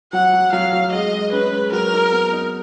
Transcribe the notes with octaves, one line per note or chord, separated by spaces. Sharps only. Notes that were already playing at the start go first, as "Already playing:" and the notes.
F#3 F#5
F#3
F#3 F5
F#3
G#3 D#5
G#3
C#4 B4
G#3
F#3 A#4
D#4
B3
D#4